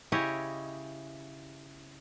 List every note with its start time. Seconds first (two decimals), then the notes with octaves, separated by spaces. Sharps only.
0.12 C#3 E4 G4 C#5 D#5